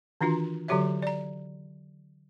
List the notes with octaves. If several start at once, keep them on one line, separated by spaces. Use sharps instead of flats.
D#3 E3 D4 F4 F#4
D3 F#3 F#4 G4 C#5 E5
D5 A#5